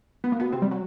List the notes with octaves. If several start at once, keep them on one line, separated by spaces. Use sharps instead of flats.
B3
A#3
B2 B3
C3 C4
G3
F#3